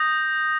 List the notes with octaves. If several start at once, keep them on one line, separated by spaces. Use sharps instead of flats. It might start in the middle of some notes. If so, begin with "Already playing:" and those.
Already playing: D#6 G6 A#6